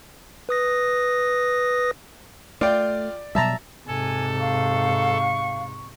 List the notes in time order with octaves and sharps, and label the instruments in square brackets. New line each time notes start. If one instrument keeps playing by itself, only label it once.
[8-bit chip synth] B4 D#6 A#6
[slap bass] A3 [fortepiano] F4 G5 [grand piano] D5
[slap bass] B2 F#3 G3 [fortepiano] E5 A5 A#5
[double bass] G#2 C3 [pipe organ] A4 [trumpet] G#5
[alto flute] F5 [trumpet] C#6